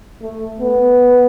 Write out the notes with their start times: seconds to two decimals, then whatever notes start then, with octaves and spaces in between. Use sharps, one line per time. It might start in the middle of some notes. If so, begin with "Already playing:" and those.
0.22 A3
0.60 B3